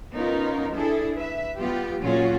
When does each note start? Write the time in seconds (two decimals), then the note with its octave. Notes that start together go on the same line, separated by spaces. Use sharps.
0.14 B3 C#4 D#4 F4 A#4
0.73 D4 E4 G#4 A4
1.14 B4 E5
1.57 G3 B3 F4 G4
2.01 A#2 F#3 C#4 F4 F#4 G#4